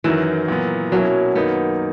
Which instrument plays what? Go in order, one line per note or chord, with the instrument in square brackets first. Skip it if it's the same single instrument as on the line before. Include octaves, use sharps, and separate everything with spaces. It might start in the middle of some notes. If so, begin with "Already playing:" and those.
[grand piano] F#2 D#3 F#3 [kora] E3
[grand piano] A#2 F#3 B3
[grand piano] B2 A#3 C#4 E4 [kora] F#3
[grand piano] F#2 D#3 A#3 D#4 [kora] B3